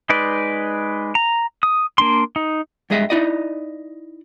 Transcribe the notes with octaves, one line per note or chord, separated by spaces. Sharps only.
G#3 D#4 B4 D5
A#5
D#6
A#3 D4 C6
D#4
G2 G#3 G#4 D#5 E5
D#4 E4 D5 D#5